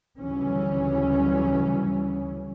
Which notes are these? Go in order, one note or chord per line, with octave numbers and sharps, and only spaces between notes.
D2 C#3 E3 F#3 G3 C#4